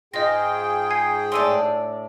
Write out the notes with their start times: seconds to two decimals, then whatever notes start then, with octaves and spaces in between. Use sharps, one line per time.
0.14 G#2 F4 G#4 D#5 G5 A#6
0.90 G#5 G#6 C7
1.32 A2 D4 D5 C6 E6 D#7